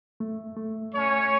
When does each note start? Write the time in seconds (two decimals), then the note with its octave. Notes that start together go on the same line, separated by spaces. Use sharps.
0.20 A3
0.57 A3
0.94 A3 C#4 C#5